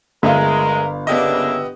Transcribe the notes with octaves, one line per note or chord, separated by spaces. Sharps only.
G1 G#3 A#4 E5 F5
C#3 A#3 B3 D4 G4 D#5 E5